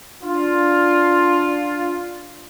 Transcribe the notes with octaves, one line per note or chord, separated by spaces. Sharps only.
D4 F4